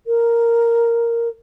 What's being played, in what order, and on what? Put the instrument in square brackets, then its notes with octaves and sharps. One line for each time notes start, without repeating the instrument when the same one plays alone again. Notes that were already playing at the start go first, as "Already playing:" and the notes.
[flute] A#4